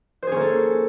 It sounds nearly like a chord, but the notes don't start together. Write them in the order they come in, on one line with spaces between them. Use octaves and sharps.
C5 G#4 C#4 A#3 A4